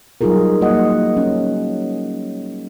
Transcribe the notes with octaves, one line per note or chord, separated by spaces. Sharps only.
F#3 G3 D#4 F4 G#4 A#4
A#3 F#4 D#5 F#5
C#4